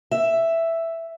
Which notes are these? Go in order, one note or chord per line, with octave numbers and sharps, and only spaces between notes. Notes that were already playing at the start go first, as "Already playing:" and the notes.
E5